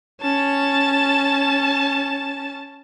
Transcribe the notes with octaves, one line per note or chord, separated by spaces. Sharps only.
C#4 A5